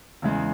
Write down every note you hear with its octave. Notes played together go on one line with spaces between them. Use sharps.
E2 C#3 G#3